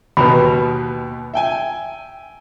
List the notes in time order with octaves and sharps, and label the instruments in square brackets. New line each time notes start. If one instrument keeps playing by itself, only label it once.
[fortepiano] D#2 B2 [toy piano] B4 A#5 B5
[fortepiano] E5 G5 G#5